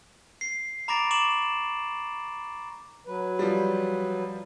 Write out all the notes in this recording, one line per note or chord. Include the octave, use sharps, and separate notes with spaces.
C7
A#5 B5 D6 A6 A#6 D7
C#6 D6 E7 F#7
F#3 B4
F3 G3